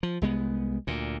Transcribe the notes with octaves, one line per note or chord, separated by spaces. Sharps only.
F3
C2 G#3 B3
D2 A#2